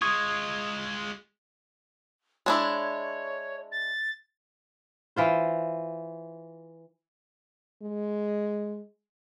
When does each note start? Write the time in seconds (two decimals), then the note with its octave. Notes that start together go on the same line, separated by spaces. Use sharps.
0.02 G#3 F4 C#6 D#6 G#6
2.46 G#3 D4 E4 C#5
3.72 A6
5.16 E3 F4 C5
7.82 G#3